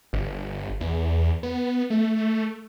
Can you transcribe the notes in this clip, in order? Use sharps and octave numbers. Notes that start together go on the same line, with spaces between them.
G1
E2
B3
A3